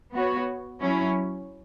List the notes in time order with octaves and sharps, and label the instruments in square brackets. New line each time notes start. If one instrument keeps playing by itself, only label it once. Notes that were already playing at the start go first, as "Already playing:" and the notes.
[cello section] B3 F#4 C#5
F#3 C#4 E4